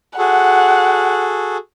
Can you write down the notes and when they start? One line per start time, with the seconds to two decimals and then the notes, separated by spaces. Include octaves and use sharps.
0.18 F#4 G#4 A4 F#5